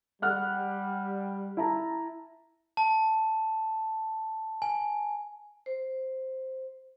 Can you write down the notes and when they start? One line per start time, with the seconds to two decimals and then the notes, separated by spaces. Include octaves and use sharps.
0.22 G3 F#5 F6 F#6
1.57 E4 A5 A#5
2.77 A5
4.62 G#5
5.66 C5